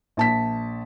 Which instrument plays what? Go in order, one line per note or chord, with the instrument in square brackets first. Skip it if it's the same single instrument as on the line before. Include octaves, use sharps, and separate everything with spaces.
[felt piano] A#1 A5 B6